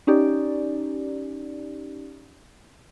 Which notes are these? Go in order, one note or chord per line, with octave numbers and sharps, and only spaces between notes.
C#4 D#4 G4 D5